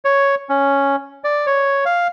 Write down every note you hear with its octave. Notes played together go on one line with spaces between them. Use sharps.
C#5
C#4
D5
C#5
F5